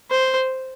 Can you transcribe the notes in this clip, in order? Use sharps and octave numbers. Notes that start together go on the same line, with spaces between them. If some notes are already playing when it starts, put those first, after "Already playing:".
C5